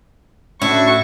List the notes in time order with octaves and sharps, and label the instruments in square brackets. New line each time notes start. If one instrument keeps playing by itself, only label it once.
[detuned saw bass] A2 [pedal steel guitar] C#4 D4 [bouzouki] E4 [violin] F#4 C#6